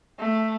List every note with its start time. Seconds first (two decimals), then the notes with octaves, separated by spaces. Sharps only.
0.19 A3